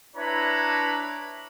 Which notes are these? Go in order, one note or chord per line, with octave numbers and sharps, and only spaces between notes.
D4 E4 B4 C#5 A#5 B5